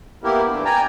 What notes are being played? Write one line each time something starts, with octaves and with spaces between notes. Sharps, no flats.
A#3 B3 E4 G4 A#4
E3 A3 D4
D5 G5 G#5 A#5